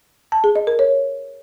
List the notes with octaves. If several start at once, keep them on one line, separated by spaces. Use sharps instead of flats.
A5
G#4
D#5
A#4
C#5